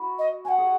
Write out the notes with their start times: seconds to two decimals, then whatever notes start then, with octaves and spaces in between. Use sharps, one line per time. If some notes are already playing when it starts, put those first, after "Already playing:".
Already playing: E4 F#4
0.19 D#5
0.45 F#4 G#5
0.48 F#5
0.58 G#4